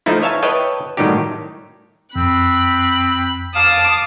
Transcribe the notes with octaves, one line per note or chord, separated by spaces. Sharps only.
F3 A3 D#4 E4
B4 C#5 E5 F5 G#5 A5
B4 C#5 D#5 G5 A5
A2 D#3 F#3 G3 D#4 G4
F2 C4 B5 F#6
F5 A5 D6 D#6 E7